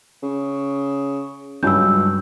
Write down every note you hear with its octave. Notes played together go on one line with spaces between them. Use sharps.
C#3
C#2 G2 F#3 C#4 E6 G6